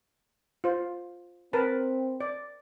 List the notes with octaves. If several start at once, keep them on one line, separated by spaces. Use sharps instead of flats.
F4 C5
C4 A#4 B4 A5
D5